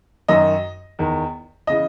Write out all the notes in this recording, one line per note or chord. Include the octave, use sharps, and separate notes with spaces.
F#2 D#3 D#5
E2 D#3
C#3 E3 D#5